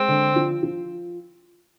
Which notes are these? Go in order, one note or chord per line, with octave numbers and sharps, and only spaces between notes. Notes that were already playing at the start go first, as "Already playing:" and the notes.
Already playing: G#3 C4
D3
F3
F3